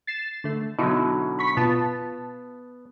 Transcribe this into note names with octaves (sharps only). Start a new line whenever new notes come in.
A6 C7 E7
D3 A3
B2 D3 F#3 D#4 E4
B5 C#6 B6
B2 B3 F4 A5